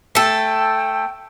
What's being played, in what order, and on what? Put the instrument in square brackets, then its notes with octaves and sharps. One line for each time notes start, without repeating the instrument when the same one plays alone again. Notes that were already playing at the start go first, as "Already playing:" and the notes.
[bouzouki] A3 A4 [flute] G5